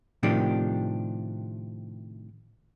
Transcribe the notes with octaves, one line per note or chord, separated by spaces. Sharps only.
A2 C3 D#3 F3 D4 G4